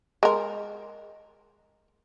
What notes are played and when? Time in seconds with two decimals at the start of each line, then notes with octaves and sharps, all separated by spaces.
0.23 G#3 A#4